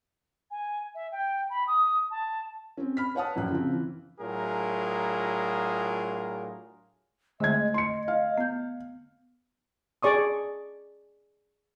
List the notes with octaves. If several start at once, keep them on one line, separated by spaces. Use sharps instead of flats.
G#5
E5
G5
B5
D#6
A5
C4 C#4
B5 F6 B6
B4 C#5 F#5 A5 D#6
A#1 F#2 F#6
C#3 F3 C4
E3
A2 F#3 D4 F4 G#4 A#4
D3 G#3 A3 E5 G#6
D#5
C6 C#7
F5
B3 G6
G#4 D5 C#6 D#6